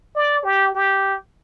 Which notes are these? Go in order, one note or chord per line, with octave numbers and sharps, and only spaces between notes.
D5
G4
G4